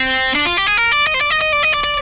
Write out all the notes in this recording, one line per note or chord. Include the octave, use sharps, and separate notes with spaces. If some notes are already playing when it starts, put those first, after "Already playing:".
Already playing: C4
D4
F4
G4
G#4
A#4
D5
D#5
C5
D5
D#5
D#5
D5
D#5
D5
D5